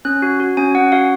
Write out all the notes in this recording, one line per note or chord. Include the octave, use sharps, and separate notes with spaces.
C#4 F#6
F#4
F#4
C#4 G#5
C#4 F#5
F#4 F5